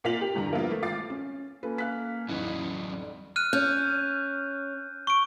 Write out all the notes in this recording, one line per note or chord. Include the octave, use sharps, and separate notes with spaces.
A#2 A#3 F4 B6 F7 F#7
G4
E2 G2 D3 A#5
F3 A#3 B3 E4 F4
A3
G#1 F4 D6 A6 C7
C#4
A#3 C#4 F4 A4 B4
F5 F#6 B6
A1 E2 G#2 F#3 C#4 D#4 E4
F2 G3
F6 F#6 D#7
C#4 G6
C#6 D7